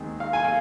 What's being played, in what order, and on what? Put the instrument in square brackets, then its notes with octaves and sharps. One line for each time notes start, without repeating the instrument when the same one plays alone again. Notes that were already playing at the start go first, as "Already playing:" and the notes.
Already playing: [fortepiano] D#2 D#3 G#3 C4
F5
G#5
F5